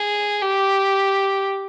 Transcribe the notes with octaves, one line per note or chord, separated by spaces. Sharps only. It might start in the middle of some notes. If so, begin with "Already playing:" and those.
Already playing: G#4
G4